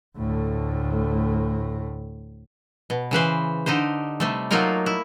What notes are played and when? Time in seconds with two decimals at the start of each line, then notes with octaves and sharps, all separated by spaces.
0.18 D2 A2
2.90 B2
3.11 C#3 E3 B4 C5
3.66 D3 D#4 G4 C5
4.20 C3 G3 A3
4.51 F#3 A3 A#3 D#4 F4 A#4
4.86 E4